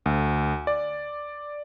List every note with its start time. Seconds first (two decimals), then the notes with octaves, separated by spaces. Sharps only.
0.06 D2
0.67 D5